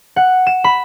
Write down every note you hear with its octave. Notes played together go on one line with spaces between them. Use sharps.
F#5
E7
B5